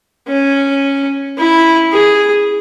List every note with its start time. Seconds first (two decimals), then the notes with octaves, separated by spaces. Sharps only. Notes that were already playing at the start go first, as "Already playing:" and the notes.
0.28 C#4
1.38 E4
1.92 G#4